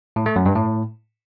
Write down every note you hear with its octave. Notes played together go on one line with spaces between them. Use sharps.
A2
A3
F#2
G2
A2